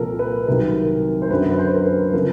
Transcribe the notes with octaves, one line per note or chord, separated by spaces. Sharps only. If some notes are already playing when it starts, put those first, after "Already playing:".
Already playing: C2 A#2 F3 A4 A#4
B4
C2 C3 D#3 F#3 A#4
C5
F#2 D3 F#3 B4
B4
C5
A#4
B4
C#3 F3 A#4